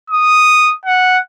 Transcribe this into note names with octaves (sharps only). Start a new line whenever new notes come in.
D#6
F#5